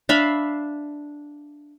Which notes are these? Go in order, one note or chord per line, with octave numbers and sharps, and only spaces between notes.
D4 E5 F5 B5